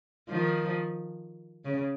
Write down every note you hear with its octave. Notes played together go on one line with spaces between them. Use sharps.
D#3 F3
C#3